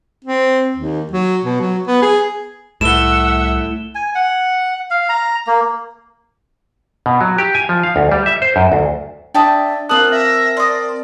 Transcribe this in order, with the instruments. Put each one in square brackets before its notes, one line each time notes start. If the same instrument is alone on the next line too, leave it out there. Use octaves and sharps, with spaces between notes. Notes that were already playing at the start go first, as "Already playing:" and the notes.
[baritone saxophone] C4
D#2
F#3
B2
F#3
B3
G#4
[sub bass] C2 [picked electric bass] A2 [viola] E5 F#5 [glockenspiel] E7 G7
[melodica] G#5
F#5
F5
A#5
A#3
[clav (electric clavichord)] B2
F#3
G4
G#5
F3
F5
D2
G3
E5
C5
F#2
D2
[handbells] D4 D5 E5 [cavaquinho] G5 A5 D#6
[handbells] C4 A#4 A5 [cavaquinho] F4 D5 D#6 [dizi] F#6 [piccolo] F#7
[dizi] E5 [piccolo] A#6
[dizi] D5 [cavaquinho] C6 D#6